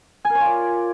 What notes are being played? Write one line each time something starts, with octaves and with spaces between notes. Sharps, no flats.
G#5
A#4
C#5
F4
D5